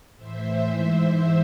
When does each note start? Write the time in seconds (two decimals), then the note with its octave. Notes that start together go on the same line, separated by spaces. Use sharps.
0.16 A2 E3 C5 E5
0.69 G#2 E3